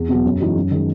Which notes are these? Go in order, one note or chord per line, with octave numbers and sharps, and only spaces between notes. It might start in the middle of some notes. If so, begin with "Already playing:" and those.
Already playing: E2
B2 F#3 B3 F#4
F#2
E3 G#3 D#4 F#4
F#2
D#3 G#3